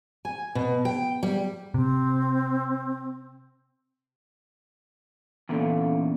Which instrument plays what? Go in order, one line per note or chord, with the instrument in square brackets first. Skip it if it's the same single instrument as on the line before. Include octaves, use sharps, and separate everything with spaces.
[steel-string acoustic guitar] G#5
B2
G5
G3
[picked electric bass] C3 [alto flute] C4
[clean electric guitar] E2 A#2 D3 [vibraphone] C#4 A4 F5